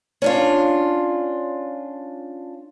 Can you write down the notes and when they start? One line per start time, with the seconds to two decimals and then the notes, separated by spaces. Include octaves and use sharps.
0.22 C#4 D4 F4